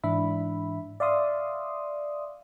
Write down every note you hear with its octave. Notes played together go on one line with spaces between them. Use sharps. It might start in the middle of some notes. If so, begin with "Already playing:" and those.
G#2 E3 D4 E5 B5
D5 E5 F5 C6 D#6